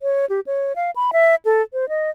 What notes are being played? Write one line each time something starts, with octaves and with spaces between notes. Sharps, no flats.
C#5
G4
C#5
F5
B5
E5
A4
C5
D#5